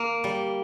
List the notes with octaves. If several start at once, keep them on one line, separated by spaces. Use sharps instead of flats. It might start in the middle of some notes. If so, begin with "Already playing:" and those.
Already playing: A#3
G3